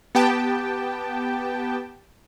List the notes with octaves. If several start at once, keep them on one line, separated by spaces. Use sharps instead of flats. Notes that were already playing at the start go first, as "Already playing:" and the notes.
B3 G4 G5 A5